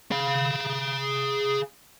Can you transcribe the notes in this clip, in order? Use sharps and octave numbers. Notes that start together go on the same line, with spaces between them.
G#4 F5